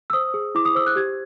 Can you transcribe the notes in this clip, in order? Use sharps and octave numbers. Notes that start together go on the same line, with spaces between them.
E6
C5 D#6
G#4
E4 D6
D#6
C5 E6
F#6
G4 G#6